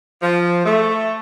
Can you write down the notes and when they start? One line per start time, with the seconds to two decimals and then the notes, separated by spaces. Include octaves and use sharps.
0.22 F3
0.65 A3